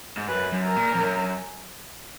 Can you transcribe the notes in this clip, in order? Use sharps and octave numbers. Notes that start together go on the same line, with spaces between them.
G#2
F#2 B4
F#2
A#4
A#2
F2
F#2